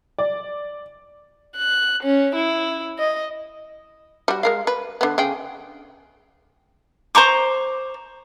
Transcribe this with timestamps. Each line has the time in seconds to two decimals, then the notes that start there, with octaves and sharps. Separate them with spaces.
0.19 D5
1.58 F#6
2.03 C#4
2.35 E4
2.99 D#5
4.28 G3 F#4
4.43 G#3 A#4 F5
4.67 B4
5.01 D3 B3
5.18 C#3 G#4 G5
7.15 C5 A#5 C#6 D6